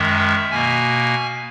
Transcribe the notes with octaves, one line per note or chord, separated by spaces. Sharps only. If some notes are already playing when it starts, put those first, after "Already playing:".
Already playing: F#2 D#3 G#3 E5
B2 A#3 G#5